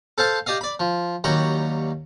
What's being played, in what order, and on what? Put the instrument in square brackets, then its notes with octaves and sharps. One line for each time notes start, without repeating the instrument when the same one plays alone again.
[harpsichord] A4 C5 F5 A5
G4 D5 D#5 F5
D5 B5
F3
D#2 F#3 G3 C#5 A#5 B5